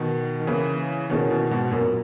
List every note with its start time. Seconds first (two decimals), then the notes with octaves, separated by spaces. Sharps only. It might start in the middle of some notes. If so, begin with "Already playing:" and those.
Already playing: B2 D#3
0.40 D#3
0.47 C#3 E3 A#3 E4 B4
1.10 B2 D#3 A#3 C#4 E4 G#4
1.30 B2 D#3
1.51 G#2 B2
1.71 F#2 A#2 F#3 B3 F#4 A#4